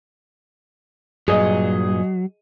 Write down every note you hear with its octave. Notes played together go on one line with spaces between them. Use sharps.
G2 A#2 F#3 G#4 D#5